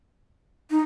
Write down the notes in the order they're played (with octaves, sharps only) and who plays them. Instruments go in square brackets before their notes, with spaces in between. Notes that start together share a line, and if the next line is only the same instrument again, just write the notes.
[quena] D#4